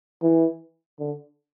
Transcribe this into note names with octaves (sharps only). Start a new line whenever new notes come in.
E3
D3